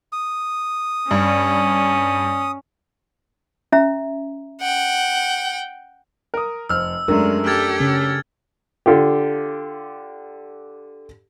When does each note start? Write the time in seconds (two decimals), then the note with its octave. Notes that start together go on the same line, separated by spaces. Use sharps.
0.13 D#6
1.11 G2 C#4
3.72 C#4 E5 A#5
4.61 F#5 G5
6.34 A#4 D#6
6.69 F1 C5 E6 F6
7.08 F#2 G#3 A3 D4 A#4
7.46 G4 A4 F6 G#6 A6
7.80 C#3 C#4
8.86 D3 F4 G4